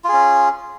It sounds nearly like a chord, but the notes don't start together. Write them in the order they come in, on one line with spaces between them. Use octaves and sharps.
F4 G#4 C#4